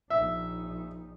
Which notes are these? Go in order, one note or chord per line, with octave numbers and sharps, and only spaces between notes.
A#1 D#4 E5